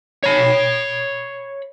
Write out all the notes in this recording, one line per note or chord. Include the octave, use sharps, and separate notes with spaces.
C#5 B5